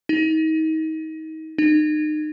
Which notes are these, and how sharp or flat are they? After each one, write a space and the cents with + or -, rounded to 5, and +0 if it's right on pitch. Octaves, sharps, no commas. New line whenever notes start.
D#4 +30
D#4 -35